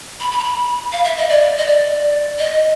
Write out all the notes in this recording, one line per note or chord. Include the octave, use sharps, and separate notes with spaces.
B5
B5
A#5
B5
F5
E5
D#5
D5
D#5
D5
D#5